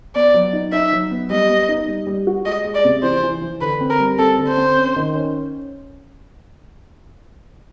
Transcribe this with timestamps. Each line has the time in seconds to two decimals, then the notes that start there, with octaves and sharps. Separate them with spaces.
0.15 B3 D5
0.34 F#3
0.53 D#4
0.72 D#4 E5
0.93 F#3
1.11 B3
1.30 G3 D#5
1.49 B3
1.69 D#4
1.88 G3
2.07 G3
2.27 F#4
2.46 G#3 D#5
2.64 G#3
2.75 D5
2.85 C3
3.03 E3 C5
3.23 E3
3.41 E3
3.61 D3 B4
3.81 C4
3.90 A#4
3.99 G3
4.19 C4 A4
4.38 D3
4.48 C5
4.57 C4
4.76 C#4
4.96 D#3
5.15 C#4